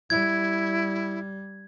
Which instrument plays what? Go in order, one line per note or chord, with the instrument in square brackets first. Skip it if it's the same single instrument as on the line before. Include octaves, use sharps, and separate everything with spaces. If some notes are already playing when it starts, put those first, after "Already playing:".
[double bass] G3 [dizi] E4 [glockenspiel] G#6